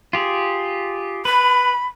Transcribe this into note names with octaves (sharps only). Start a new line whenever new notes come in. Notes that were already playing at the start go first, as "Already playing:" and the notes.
F4 G4 G#4
B4 B5